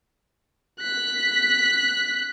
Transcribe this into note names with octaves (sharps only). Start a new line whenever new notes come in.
F#6 B6